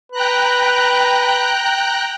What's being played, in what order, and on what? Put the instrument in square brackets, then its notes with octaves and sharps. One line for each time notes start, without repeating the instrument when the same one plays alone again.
[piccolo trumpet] B4 [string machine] G5 A#5 F#6